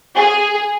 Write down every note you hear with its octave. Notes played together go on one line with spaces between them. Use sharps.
G#4